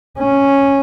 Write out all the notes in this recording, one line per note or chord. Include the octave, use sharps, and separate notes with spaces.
C#4